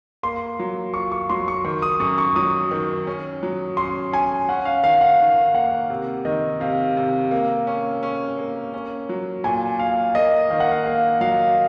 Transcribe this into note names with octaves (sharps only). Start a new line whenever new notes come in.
A#3 C6
F#3
F4 C#6
C#6
F#3 C6
C#6
D#3 C#6
D#6
F#2 C#6
C#6
F#3 D#6
D#3
C#4
F#3
C#4 C6
C#4 G#5
C#4 F#5
F5
D#3 F5
F#5
D#3
A#3 F#5
C3
D#3 D#5
C3 F5
C3
A#3
C#4
C#4
A#3
C#4
F#3
A#2 G#5
A#2 F5
A#3 D#5
D#3 F5
F#5
F5
A#3 F5
F#3 F5